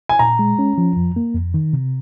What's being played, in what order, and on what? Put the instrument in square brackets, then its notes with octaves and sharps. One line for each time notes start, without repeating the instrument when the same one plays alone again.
[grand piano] G#5
[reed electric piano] A#2 [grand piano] A#5
[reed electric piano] G#3
C#4
F3
F2
A#3
F2
D#3
C3